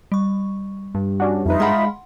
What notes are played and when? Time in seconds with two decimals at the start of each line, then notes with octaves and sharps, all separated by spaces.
0.12 G3 C#6
0.95 G2
1.20 C#4 D4 F#4
1.46 F2 D#4 F4 B4 E5
1.60 G#3 F5 F#5 B5 C6